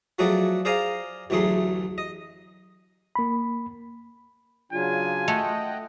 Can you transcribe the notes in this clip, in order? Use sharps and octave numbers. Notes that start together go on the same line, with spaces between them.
F3 F#3 A3 F#4 G#4 D5
G#4 C5 D5 F5 G#5 A#5
A1 D2 F#3 A3 G#4 C6
D#5
A#3 B5
C#3 F#3 D4 F4 G#5
A3 D#5 F#5 G5